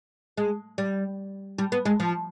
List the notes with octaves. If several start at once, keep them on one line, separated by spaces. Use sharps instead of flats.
G#3
G3
G3
B3
G#3
F3